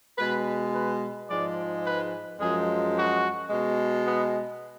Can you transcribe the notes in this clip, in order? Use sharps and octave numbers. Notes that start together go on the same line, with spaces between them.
B2 G#3 B4
B4
G#2 F3 G#3 D5
B4
F#2 F3 G#3 G#4
F#4
B2 G#3
B3